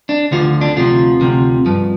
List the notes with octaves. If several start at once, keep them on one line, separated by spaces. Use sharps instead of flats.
D4
D2 D3 F3 F4
D4
D2 C3 F3 F4
D2 C3 F3
G2 F3